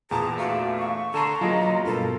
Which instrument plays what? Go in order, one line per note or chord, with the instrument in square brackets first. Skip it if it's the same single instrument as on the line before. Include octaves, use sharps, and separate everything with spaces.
[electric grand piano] E2 A#2 A5 [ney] G#4 [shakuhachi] A#5
[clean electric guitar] A3 D4 [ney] F#4 [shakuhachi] F5
[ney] C#6
[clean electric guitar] D3 A5 C6 [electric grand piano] A4 [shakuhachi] A#5
[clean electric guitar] F#3 A#3 B3 [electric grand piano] F4 G#4 [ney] D#5
[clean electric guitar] G2 B2 [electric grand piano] F4 [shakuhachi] A4 [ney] A#4